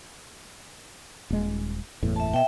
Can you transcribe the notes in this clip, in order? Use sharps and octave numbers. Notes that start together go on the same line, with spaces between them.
D#1 G#3
F#1 E2 A2
E5 A5
B2 E5 G5